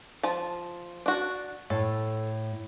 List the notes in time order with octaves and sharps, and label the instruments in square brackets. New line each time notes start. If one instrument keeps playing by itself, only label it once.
[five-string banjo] F3 A5
D4 F#4
[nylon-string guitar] A2 [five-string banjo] A4